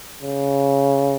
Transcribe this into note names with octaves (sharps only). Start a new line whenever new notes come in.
C#3